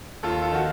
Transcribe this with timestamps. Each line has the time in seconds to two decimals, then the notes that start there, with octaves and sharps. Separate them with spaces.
0.23 D#2 F4 A4
0.42 F4 A4
0.52 D#3 F#4